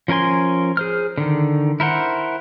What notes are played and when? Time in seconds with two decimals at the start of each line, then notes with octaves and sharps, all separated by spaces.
0.08 F3 C#4 A#4 G#5 C6
0.77 G#4 C5 F6
1.18 D3 D#3
1.80 E4 A#4 C5 F#5